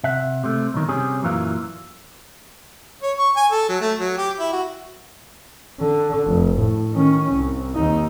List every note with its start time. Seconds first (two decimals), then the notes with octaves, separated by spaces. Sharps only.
0.04 C3 E5 F#5
0.44 C3 A3
0.74 B1 D#3
0.89 C3 G3 C#4 G#4
1.22 F#2 A#2 E3 F#3 F5
3.03 C#5
3.17 C#6
3.36 G#5
3.51 A4
3.69 F#3
3.81 A3
3.99 F#3
4.17 G4
4.39 E4
4.52 F#4
5.80 D3
6.27 F1
6.58 A2
6.93 D#3 C#4
7.32 C2
7.75 D#2 D#4